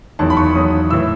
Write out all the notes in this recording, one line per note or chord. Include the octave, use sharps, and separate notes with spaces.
E2 D#3 F#3 A5
B5
C#6
E2 D#3 F#3 D#6
A2 E3 E6